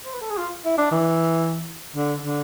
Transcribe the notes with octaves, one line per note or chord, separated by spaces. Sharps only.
C5
B4
A4
G#4
F4
E4
D4
E3
D3
D3